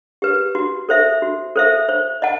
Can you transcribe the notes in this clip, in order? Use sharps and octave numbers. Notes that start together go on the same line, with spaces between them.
G4 B4
F#4
A4 C5 E5
F#4
A4 C5 E5
C5
D#5 F#5 A5